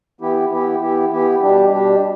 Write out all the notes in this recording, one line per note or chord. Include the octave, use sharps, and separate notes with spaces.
E3 B3 E4 G4
E3 B3 E4 G4
E3 B3 E4 G4
E3 B3 E4 G4
B2 G3 D4 G4
B2 G3 D4 G4